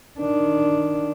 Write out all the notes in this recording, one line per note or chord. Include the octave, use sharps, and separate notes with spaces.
D#3 D4